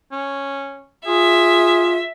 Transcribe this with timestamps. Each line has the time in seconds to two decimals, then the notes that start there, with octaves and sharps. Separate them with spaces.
0.12 C#4
1.06 F4 G#4 E5